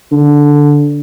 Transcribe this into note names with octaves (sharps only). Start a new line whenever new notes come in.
D3